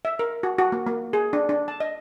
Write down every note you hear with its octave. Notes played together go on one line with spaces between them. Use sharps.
E5
A#4
F#4
F#4
A#3
A#3
G#4
D4
D4
A5
D#5